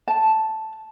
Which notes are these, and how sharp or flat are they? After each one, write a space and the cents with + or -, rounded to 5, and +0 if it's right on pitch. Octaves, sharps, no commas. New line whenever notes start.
A5 +0